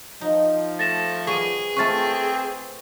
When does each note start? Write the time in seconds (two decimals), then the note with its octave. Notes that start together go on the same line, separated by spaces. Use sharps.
0.21 F3 D#4
0.79 A3 A6 A#6 E7
1.27 G3 B3 G#4 C#6 D#7
1.77 A3 C4 F4 B4 C#6 A6